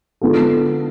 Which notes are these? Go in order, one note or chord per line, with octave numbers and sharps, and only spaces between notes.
D3 G#3 B3 F4 A4